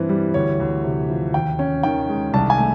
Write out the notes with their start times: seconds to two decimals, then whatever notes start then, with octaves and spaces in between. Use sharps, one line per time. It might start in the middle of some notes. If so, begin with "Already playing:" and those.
Already playing: G2 E3 C4
0.09 G3
0.34 D2 C#5
0.60 D2
0.84 C3
1.10 F3
1.34 D#2 G5
1.59 C#4
1.83 D#3 G5
2.09 G#3
2.34 C2 A5
2.50 G#5
2.58 A3